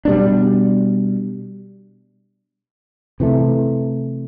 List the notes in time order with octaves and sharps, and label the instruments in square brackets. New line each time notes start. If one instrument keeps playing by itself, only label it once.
[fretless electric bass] B2 G3 B3 D4
C3 E3 A3